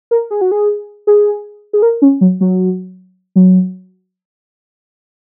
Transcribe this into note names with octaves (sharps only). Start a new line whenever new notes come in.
A#4
G#4
F#4
G#4
G#4
G#4
A#4
C#4
F#3
F#3
F#3